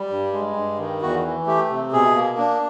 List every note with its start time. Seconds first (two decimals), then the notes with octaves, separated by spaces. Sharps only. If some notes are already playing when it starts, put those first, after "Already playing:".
Already playing: G3
0.10 G2
0.33 G#3
0.56 G2
0.79 D#3
1.01 E2 F#4
1.24 E3
1.46 A3 G4
1.69 C3
1.92 B2 G#4
2.15 A#3
2.38 D4